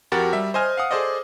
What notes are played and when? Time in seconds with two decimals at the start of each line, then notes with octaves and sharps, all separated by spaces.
0.12 F2 F#4 G4 A#4 F#5 A6
0.33 G3 E5
0.54 C5 D#5 G#5 F6
0.77 F5 F#5 D#6
0.91 G#4 A4 C5 D5 D#5